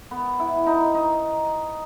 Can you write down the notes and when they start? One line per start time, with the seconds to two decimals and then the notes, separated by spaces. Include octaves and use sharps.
0.11 B3
0.39 E4
0.66 D#4
0.95 D#4